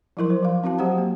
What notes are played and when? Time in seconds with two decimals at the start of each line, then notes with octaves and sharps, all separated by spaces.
0.17 F3 F#3 E4 A#4 C6
0.30 C5
0.42 F3 F5
0.64 C4 E4 F#4 F5 A5
0.78 F#3 G4 C5 F#5 A#5
0.98 A#3